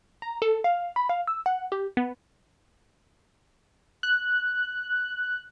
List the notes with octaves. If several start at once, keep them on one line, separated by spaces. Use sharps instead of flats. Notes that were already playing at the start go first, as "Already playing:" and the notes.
A#5
A4
F5
B5
F5
E6
F#5
G4
B3
F#6